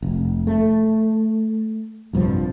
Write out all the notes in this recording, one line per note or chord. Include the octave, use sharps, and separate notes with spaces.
F1
A3
A#1 G2 C3 F3